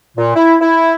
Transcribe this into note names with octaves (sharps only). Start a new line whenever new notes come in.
A#2
E4
E4